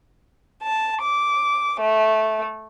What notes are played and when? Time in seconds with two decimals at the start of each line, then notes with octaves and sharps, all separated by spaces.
0.63 A5
1.02 D6
1.80 A3